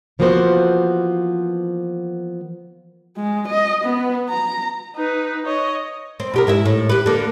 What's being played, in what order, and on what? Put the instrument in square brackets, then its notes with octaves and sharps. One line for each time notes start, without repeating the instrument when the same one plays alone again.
[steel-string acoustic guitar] E3 F3 A#3 B3 F#4 C5
[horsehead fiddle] G#3
D#5
B3
A#5
[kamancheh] D#4 B4
C#5 D#5
[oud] C4
B2 G4 A#4
G#2 E4 E5
A2
G4 B4
D3 A#3